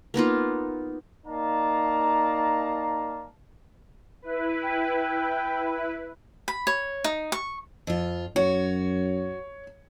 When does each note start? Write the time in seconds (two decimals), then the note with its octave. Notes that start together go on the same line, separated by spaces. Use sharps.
0.14 A#3 B3 D#4 F4
1.26 A#3 D#4 D5 F5 A5 A#5
4.22 E4 B4
4.64 G5
6.48 B5
6.67 C#5
7.04 D#4
7.32 C#6
7.87 F2 F4
8.36 F#2 F#4 C#5